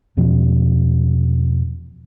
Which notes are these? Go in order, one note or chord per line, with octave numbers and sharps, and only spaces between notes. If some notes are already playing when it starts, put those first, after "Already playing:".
E2 B2 F3 C#4